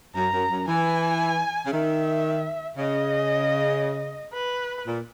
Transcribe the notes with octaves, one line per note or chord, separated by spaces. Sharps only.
F#2 A#5
F#2
F#2
E3 G#5
C#3
D#3 E5
C#3 D#5
B4
A#2